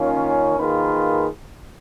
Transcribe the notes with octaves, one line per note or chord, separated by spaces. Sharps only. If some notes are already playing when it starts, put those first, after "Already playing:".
Already playing: D#3 A#3 C#4 F4
D#3 A#3 F4 G#4 B4